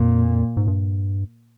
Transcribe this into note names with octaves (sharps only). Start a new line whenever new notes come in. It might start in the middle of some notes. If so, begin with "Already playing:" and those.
Already playing: F2 A#2
G#2
G2